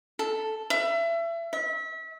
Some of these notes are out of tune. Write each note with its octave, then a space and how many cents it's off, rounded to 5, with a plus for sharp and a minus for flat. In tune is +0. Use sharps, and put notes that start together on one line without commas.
A4 -5
E5 +30
E5 -30